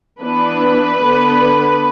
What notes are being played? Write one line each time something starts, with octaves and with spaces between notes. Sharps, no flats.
E3 B3 D4 B4
D3 B3 D4